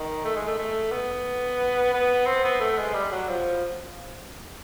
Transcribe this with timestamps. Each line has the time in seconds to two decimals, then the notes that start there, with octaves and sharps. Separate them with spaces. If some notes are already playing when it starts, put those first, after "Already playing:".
Already playing: D#3
0.24 A3
0.36 G#3
0.47 A3
0.58 A3
0.91 B3
1.94 B3
2.26 C4
2.44 B3
2.60 A3
2.78 G#3
2.94 G3
3.12 F#3
3.28 F3